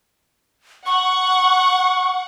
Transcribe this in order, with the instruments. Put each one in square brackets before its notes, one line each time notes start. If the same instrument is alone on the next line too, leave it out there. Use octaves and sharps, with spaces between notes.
[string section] F#5 [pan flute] C#6